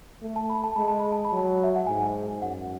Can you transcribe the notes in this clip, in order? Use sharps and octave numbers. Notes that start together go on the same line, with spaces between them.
A3
A5
B5
A5
G#3 B5
A5
B5
A5
B5
F#3 A5
E5
F#5
G#2 G#5
F#2 F#5